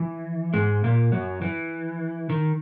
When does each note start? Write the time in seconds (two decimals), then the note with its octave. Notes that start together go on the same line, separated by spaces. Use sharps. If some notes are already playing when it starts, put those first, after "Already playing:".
Already playing: E3
0.54 G#2 G#3
0.84 A#2 A#3
1.12 F#2 F#3
1.42 E3
2.30 D#3